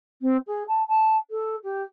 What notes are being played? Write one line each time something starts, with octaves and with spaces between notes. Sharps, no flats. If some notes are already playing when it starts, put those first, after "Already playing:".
C4
G#4
A5
A5
A4
G4